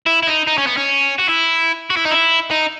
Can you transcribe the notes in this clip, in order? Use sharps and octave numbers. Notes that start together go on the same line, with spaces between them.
E4
E4
D#4
D#4
C#4
B3
C#4
F#4
E4
F#4
E4
D#4
E4
D#4